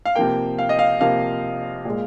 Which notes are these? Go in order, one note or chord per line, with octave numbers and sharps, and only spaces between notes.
F5
C3 F3 A#3 G5
F5
D#5
F5
C3 F3 A#3 F5
A#2 G#3